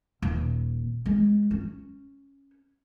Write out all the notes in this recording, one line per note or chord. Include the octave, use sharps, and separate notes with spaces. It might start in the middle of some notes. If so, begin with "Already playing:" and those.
D#1
G#3
C#4